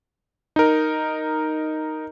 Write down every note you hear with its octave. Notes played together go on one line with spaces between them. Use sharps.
D#4 A#4